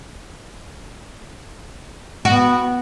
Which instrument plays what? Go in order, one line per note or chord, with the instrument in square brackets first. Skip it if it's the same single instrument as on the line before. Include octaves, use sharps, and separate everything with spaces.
[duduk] B3 [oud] F#4